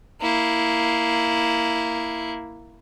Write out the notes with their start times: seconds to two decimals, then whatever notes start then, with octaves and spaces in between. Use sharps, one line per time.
0.21 A#3 E4